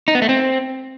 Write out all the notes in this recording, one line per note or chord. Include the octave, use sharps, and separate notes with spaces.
D#4
B3
A3
C4